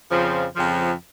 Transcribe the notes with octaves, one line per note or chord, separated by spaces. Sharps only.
F2 C#3 F3
F2 C#3 F3